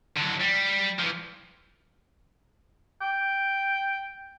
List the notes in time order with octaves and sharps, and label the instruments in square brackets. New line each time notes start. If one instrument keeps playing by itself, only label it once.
[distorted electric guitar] D3 F#3
G3
E3 F3
[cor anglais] G5